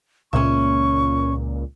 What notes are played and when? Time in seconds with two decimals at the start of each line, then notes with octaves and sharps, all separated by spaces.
0.33 C#2 A#2 C#4 E5 C#6